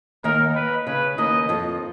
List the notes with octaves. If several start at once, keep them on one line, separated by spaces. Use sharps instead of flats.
D#2 D#3 A#4
B4
C#3 B4
D#2 D#3 D#5
F2 F3